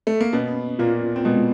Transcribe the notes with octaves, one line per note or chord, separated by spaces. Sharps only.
A3
A#3
B2 B3 C#4
A#2 A#3 F4
C4
B2 G#3 B3